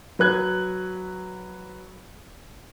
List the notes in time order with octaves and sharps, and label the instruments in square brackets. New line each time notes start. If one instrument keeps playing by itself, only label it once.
[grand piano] F#3 B4 F#6 G#6